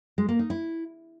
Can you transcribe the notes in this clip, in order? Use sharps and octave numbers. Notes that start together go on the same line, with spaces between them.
G#3
A#3
D#4
E4